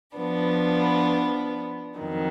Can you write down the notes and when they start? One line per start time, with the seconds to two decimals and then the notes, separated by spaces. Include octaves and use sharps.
0.15 F3 B3 D4
1.99 F2 D#3 F#3